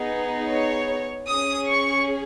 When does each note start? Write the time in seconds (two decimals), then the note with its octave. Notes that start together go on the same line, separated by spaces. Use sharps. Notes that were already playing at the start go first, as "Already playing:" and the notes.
Already playing: B3 D#4 G#4
0.48 C#5
1.27 C#4 G#4 D#6
1.67 C#6